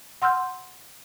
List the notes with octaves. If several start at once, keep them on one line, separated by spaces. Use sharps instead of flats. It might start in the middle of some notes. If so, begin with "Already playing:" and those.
F#5 C6 E6 F6 G6